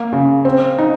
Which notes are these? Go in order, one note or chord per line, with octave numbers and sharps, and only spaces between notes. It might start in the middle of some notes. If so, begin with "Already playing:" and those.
Already playing: A#3
C#3
C4
D#4